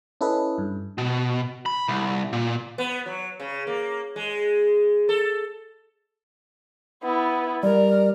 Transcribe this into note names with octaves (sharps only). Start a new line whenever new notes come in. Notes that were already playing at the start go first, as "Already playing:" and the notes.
C#4 E4 A4 B4 D#5
G2
B2
B5
C2
A#2
B3
F#3
C#3
A#3
G#3
A4
B3 E4
G3 A#4 D5